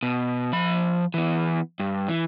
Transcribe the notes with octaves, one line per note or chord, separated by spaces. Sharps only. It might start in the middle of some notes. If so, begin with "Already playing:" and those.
B2
F3 B5
E3 B3
G2
E3